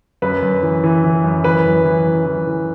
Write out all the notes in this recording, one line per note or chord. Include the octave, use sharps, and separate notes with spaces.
F#2 B4
F#2
E3
E3
E3
F#2
E3 B4
F#2
E3
F#2
E3
E3